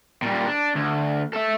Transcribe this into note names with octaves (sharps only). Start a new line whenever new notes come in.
A#2 G3
D4
D2
A4 E5